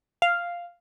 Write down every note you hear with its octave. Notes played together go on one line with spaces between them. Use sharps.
F5